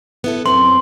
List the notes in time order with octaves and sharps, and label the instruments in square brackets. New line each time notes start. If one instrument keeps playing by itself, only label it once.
[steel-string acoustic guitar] B3 E4 A4
[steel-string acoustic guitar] F#2 B3 C4 [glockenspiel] C6